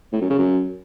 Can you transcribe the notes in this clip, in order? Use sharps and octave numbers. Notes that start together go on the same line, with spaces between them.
A2
F#2
C#3
F#2